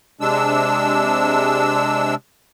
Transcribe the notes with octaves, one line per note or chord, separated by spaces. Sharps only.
C3 G#3 D4 E6